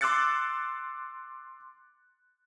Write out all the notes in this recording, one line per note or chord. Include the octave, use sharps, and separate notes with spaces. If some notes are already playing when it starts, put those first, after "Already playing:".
C6 D6 E6 F#6 A6 C#7